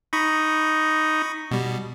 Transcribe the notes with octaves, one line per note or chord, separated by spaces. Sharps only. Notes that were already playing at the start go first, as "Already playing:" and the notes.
D#4 B5 C#6
B2 G3